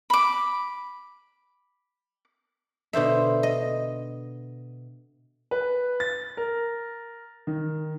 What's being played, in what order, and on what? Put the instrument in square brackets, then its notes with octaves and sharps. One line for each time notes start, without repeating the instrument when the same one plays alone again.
[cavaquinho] B5 D6
[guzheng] B2 D3 C5 E5
D#5
[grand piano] B4
A6
A#4
D#3